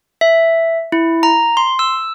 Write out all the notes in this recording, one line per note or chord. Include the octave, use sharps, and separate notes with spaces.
E5
E4
A#5
C6
E6